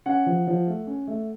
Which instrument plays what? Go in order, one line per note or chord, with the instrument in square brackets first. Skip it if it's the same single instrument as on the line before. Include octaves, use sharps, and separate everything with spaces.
[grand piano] C#4 F#5
F3
F3
A3
C#4
A3